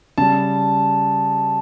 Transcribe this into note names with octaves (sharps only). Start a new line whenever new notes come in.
C#3 G3 A5